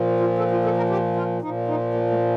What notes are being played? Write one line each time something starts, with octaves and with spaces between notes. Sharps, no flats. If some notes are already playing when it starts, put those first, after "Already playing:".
Already playing: A#2 F3
F4
A4
F4
A4
A#4
G4
F4
A#2 F3 D#4
D#4
A#3
A3